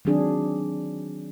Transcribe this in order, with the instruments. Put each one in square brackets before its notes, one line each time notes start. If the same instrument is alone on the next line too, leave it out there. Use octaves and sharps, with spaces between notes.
[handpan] D#3 F#3 C4 D4 G#4